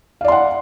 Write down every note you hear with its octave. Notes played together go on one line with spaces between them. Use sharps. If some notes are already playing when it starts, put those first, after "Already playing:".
D5 F5 F#5 C6